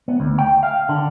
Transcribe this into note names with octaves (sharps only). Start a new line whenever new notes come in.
B3
D2
G5
F5
D3